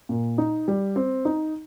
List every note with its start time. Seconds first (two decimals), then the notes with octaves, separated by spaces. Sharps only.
0.09 A#2
0.38 D#4
0.68 G3
0.96 C4
1.25 D#4